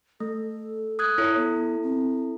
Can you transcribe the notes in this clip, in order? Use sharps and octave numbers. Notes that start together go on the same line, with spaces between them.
A3 A4
D#6 F#6 G#6
E4 A4 C#5
B3
C4